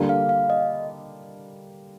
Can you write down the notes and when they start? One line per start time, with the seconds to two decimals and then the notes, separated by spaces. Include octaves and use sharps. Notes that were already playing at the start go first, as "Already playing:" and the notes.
Already playing: D3 G3 A#3
0.09 F5
0.29 F5
0.50 D#5